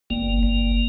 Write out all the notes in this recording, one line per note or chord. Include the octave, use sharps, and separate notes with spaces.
G1 A#3
G1